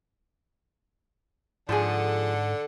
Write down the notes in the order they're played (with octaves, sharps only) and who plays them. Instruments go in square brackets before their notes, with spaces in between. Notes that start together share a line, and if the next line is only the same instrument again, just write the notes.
[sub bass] G#2 [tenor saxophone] D3 [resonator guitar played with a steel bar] F3 G#4 [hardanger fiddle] A4 F#5